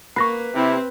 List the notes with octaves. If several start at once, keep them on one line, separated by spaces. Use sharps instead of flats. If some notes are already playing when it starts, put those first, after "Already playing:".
A#3 B4 C#6 A#6 C7
C3 C4 E4